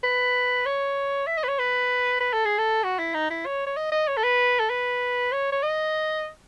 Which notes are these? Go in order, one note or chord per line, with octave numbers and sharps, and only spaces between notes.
B4
C#5
E5
D#5
B4
C#5
B4
B4
A4
G#4
A4
F#4
E4
D#4
E4
C#5
C#5
D#5
D#5
C#5
A4
B4
A4
B4
C#5
C#5
D#5